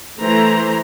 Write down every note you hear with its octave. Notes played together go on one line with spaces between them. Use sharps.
E3 A3 C5 A#5